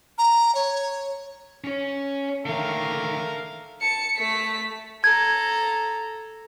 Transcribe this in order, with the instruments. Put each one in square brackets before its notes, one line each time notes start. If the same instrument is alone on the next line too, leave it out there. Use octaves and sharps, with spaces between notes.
[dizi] A#5
C#5
[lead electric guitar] C#4 C#5
[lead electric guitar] D3 D#3 [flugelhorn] A3 [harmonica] A#4 F5
[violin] A5 C#7
A3 B6
[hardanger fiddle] A4 A#5 [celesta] G#6